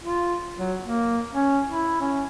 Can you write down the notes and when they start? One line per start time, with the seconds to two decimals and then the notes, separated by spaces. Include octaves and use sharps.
0.03 F4
0.58 F#3
0.82 A#3
1.34 C#4
1.68 E4
2.01 C#4